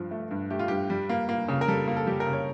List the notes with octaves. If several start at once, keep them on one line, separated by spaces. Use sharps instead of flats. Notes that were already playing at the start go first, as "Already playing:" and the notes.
Already playing: G2 F3
A3
G2
A3 G4
F4
G2 G4
G3
A#3
A#3
C#3
A#4
G3 A4
A#3
A4
G3 G4
A#4
C#3
C#5